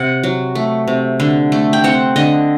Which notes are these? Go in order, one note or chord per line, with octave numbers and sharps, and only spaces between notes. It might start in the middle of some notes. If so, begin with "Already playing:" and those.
Already playing: C3 F#5
F#3
A3
C3
D3
A3
G5
C4 F#5
D3 D#5